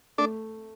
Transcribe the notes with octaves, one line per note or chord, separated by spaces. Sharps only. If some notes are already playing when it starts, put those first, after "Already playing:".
A3 D4